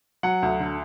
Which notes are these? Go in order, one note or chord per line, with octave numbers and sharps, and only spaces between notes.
F#3 F#5
D2
D3